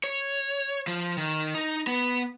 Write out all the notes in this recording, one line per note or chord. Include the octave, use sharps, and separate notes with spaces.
C#5
F3
D#3
D#4
B3